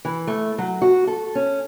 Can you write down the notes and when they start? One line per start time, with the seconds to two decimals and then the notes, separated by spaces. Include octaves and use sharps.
0.05 E3
0.27 A3
0.58 F#3
0.82 F#4
1.07 A4
1.35 C#4